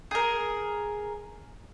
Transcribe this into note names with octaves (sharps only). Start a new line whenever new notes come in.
G#4 A#4